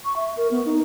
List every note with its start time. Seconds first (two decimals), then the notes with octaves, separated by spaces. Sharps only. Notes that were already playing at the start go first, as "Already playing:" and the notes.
0.05 C#6
0.16 E5
0.37 A#4
0.51 B3
0.66 D#4